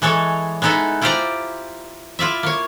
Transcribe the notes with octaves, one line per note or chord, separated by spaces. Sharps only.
E3 G#3 A4 C#5
G#3 B3 D#4 E4 A4
E4 F4 G4 C5 D5 A#5
E4 F4 D5 E5
A#3 C#5